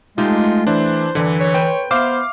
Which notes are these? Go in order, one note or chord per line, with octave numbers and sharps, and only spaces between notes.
G#3 A3 D#4 F4 G4
E3 D4 E4 C5
F#2 D3 E3 D5
C#5
B4 C5 G5
B3 C5 E5 F5 D6 F6